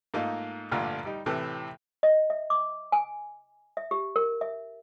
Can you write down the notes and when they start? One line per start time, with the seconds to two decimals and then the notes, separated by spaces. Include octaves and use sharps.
0.14 G#2 A3 A#3 D#4 F4 D#5
0.71 A1 G2 A#2 D3 A3 F4
1.05 G3 D#4
1.26 A2 C3 E3 A3
2.03 D#5
2.30 E5
2.50 D6
2.92 G#5
3.77 E5
3.91 G4
4.16 A#4
4.41 E5